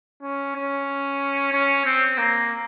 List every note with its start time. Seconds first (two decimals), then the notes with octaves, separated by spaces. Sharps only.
0.22 C#4
0.56 C#4
1.53 C#4
1.85 C4
2.18 A#3